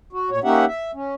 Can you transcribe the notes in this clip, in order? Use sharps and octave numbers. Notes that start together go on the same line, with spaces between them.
F#4
A#2 C#5
A#3 C#4 D#4 G4 E5 F#5
E5
C#4